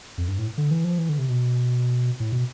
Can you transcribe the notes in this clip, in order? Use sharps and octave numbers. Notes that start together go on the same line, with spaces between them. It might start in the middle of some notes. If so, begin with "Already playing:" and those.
F2
G2
A2
D3
E3
F3
E3
D3
C3
B2
A2
B2